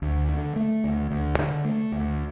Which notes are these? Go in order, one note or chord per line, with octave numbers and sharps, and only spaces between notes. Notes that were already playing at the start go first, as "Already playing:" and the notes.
D2
D3
A3
D2
D2
D3
A3
D2